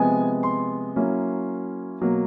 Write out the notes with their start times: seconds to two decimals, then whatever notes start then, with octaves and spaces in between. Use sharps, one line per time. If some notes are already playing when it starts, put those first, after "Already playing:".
Already playing: C3 F3 G#3 B3 G#5
0.43 C6
0.96 F#3 A#3 C#4 E4
2.01 B2 F#3 A#3